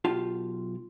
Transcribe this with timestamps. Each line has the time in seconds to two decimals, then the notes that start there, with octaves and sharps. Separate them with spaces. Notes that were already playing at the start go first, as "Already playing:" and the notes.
0.05 B1 F4 G4 A5